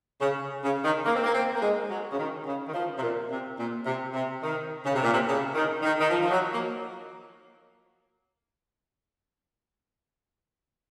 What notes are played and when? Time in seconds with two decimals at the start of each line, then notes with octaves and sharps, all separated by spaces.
0.20 C#3
0.63 C#3
0.83 D#3
1.05 A#3
1.14 C4
1.23 A#3
1.33 C4
1.54 A#3
1.61 G#3
1.88 F#3
2.10 C#3
2.17 D#3
2.45 C#3
2.67 D#3
2.73 F3
2.97 C3
3.01 A#2
3.30 C3
3.58 A#2
3.86 C3
4.13 C3
4.42 D#3
4.84 C#3
4.94 C3
5.02 A#2
5.12 C3
5.26 C#3
5.54 D#3
5.82 D#3
5.99 D#3
6.10 F3
6.21 F3
6.31 F#3
6.52 A#3